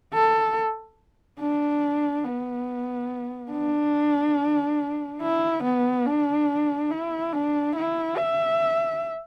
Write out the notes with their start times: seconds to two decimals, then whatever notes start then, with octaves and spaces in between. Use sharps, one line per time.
0.14 A4
1.40 D4
2.25 B3
3.52 D4
5.22 E4
5.63 B3
6.06 D4
6.91 E4
7.33 D4
7.76 E4
8.17 E5